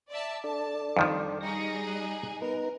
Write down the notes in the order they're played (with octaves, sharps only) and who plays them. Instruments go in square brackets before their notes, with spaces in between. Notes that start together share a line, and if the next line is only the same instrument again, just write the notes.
[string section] D5 E5 A5
[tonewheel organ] D4 A4 D5 [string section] A5
[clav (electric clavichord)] F2 D#3 F3 [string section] G3
[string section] G3 D#4 G#4 [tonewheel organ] C#6 A#6
[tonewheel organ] F#6
[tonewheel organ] B3 D#4 B4 [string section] A#4